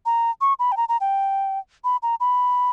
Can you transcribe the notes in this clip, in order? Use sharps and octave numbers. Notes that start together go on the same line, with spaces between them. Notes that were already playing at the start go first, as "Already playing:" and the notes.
A#5
C#6
B5
G5
A#5
A#5
G5
B5
A#5
B5